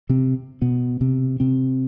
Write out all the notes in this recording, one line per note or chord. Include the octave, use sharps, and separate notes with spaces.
C3 C4
B2 B3
C3 C4
C3 C4